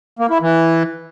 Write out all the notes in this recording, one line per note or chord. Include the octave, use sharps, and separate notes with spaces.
A#3
E4
E3